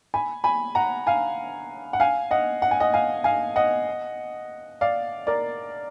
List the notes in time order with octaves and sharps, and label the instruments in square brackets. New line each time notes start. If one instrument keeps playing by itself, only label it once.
[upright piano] G#5 B5
G#5 B5
F#5 A#5
F5 G#5
F#5
F5 G#5
D#5 F#5
F#5
G#5
D#5 F#5
F5 G#5
F5 G#5
D#5 F#5
D5 F5
A#4 D5